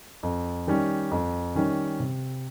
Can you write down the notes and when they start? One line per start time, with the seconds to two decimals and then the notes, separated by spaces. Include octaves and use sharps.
0.23 F2
0.67 D#3 G3 C#4
1.12 F2
1.55 D#3 G3 C#4
2.00 C3